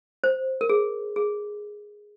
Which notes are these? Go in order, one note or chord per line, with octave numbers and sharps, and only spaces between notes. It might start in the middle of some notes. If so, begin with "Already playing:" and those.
C5
A#4
G#4
G#4